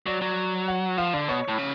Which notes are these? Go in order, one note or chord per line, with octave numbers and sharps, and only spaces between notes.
F#3 D5
F#3
F#5
F3 F5
D3 D5
B2 C#5
A2
C#3